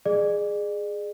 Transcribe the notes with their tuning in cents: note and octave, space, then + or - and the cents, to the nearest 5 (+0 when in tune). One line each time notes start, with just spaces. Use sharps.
G#4 +0 D5 +40